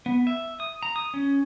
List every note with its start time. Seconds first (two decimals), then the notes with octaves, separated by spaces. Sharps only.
0.06 B3
0.27 E5
0.60 D#6
0.83 A#5
0.96 D#6
1.14 C#4